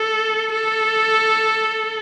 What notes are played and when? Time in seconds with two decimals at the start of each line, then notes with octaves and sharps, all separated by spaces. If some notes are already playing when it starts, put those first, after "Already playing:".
Already playing: A4
0.53 A4